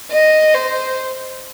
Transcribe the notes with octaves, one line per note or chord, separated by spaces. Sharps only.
D#5
C5